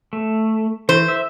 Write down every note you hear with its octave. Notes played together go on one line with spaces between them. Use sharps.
A3
E3 C5
E5